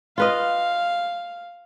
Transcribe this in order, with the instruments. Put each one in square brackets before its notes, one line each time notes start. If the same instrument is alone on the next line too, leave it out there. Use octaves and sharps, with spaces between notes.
[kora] F4 B4 D#5 [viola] F5